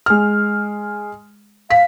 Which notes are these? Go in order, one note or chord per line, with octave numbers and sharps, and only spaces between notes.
G#3 F6
F5 B6